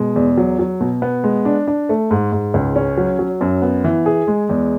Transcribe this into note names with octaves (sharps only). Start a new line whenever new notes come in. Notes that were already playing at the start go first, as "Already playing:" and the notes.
Already playing: B2 G#3
E2
F#3
F#3
B2
B3
G#3
D4
D4
A3
G#2
G#2
C#2
C#4
F#3
F#3
F#2
B3
E3
G#4
G#3
E2